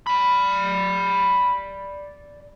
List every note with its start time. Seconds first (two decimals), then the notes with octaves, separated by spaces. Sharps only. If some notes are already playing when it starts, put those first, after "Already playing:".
0.07 D5 B5